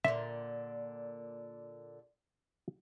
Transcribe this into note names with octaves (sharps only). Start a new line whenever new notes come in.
A#2 D3 E5